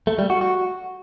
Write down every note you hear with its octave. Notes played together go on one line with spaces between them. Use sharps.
A3
G3
F#4
F#4